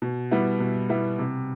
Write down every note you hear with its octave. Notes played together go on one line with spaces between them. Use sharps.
B2
G3 B3 E4
B2
G3 B3 E4
C3